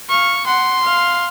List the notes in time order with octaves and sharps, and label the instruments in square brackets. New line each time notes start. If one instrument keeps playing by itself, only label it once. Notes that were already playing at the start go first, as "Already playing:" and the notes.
[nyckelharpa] F5 [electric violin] C#6
[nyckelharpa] F#5 [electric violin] C6
[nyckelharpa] F5